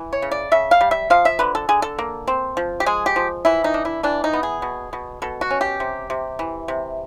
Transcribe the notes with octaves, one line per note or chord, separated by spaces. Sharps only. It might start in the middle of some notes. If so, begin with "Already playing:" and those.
Already playing: E3
C#5
C#3
D5
C#3 E5
F5
G3
E5
F3 F5
E5
D3 B4
A4
D3 G#4
A4
A#3
C4
F3
G4
G#3 G#4
G4
F3
E3 E4
D#4
D4
E4
E3 D4
D#4
B3
G#4
B2
B2
B2 A4
F#4
C#4
G4
C3
C3
E3
C3